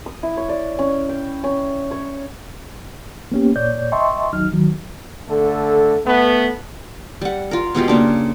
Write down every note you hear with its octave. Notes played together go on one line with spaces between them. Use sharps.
D#6
E4
C#5
D5
C#4
G5
C#4
C#5
A#3 B3 C#4 G4
A#2 C#5 D5 G6
D#5 E5 G5 A5 C6 C#6
D#2 F#3 D#4 F6
D#3 F#3
D3 A3 A4
A3 B3
G3 F#5
F4 A#4
B2 G#3 F4 G4
C#3 A#3 D4